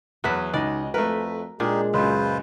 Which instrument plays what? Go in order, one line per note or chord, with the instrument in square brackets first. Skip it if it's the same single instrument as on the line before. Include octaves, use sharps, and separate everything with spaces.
[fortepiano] E2 F#3 [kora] F#4 B4 E5
[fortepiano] C#2 D#5 [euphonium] D#4 [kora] D5
[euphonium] F2 [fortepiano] A3 B4 [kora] A#4
[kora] A#2 [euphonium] G#3 [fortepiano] D4 G#4 [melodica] D#4 G4
[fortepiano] C#2 F#2 [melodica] F4 B4 C5